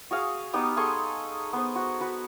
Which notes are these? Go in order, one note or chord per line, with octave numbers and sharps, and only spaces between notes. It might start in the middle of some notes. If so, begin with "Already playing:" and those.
F#4 G#4 F5
B3 D#4 G4 D#6
G#4 A4 C6 C#6
B3 C5
F#4
F#4 B4